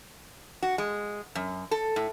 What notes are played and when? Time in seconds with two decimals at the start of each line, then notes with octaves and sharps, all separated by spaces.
0.62 F#4
0.78 G#3
1.35 F#2
1.71 A4
1.96 A2